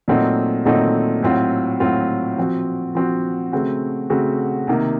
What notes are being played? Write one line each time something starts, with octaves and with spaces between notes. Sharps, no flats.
A#2 F#3 A3 C4 D#4
A#2 F#3 A3 C4 D#4
A2 F#3 C4 F4
A2 F#3 C4 F4
F3 C4 F#4
F3 C4 F#4
C#3 A3 C4 F#4
C#3 A3 C4 F#4
C3 D#3 A#3